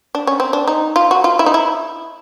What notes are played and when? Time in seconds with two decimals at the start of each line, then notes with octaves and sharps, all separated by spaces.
0.15 D4
0.27 C#4
0.40 C4
0.53 D4
0.67 D#4
0.96 F4
1.11 F#4
1.24 F4
1.39 E4
1.46 D#4
1.54 E4